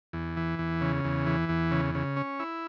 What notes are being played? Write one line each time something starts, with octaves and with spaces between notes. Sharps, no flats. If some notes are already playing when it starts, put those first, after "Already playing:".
E2
E3
E2
C#3
E2
E3
E2
C#3
C#3
C#4
E4